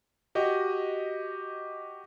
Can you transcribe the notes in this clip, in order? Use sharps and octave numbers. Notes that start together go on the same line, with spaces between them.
F#4 G4 D#5